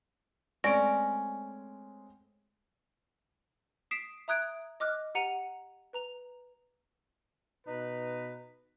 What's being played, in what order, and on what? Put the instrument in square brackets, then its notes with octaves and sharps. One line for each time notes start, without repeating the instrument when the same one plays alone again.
[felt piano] G#3 A3 C4 [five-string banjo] C#4 [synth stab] D5 [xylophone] A#6 D7
[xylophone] D#6 B6 C7 D7 E7
E5 A#5 D#6 F#6 G#6 D7
D#5 D6 F6 F#6
G4 F#5 A#5 C#7 D#7 F7
B4 A#5 F7
[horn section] B2 D#4 B4